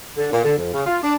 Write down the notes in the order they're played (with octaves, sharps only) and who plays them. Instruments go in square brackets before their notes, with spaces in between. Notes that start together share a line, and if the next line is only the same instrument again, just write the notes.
[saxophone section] D3
A#2
D3
F2
C#3
F4
D4